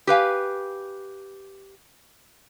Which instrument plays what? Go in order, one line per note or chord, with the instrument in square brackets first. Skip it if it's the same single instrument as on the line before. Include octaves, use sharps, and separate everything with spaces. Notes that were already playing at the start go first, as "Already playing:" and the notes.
[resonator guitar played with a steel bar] G4 B4 F5 G#5